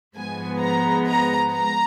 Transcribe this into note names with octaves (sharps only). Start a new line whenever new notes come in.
G#2 F3 G#3 B3 G#5
A#5
A#5
A#5